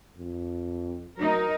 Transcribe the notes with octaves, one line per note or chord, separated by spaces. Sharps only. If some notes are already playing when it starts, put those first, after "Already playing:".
F2
F#3 D#4 A#4